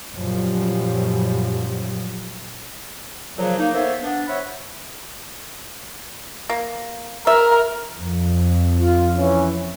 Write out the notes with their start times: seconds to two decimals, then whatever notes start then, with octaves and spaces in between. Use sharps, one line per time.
0.15 F#2 A#2 F3 G3
3.38 A#2 C#3 F3 F#3
3.58 A#3 D#4
3.74 A#3 B3 A4 C5 C#5 E5
4.02 B3 D4
4.28 C5 C#5 E5 F#5 B5
6.50 A#3
7.27 A#4 E5
7.98 F2
8.80 F4
9.17 E3 C#4